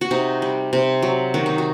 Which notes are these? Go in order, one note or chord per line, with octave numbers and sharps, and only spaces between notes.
F#4
C3 D#4
G3
C3
F#3
D#3 F#4
D#4
F#4